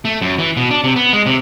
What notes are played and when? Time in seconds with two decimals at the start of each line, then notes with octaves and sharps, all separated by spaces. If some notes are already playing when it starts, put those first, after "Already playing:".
0.05 A3
0.21 F#2
0.39 E3
0.57 B2
0.71 D4
0.84 C3
0.96 B3
1.13 G#3
1.26 C3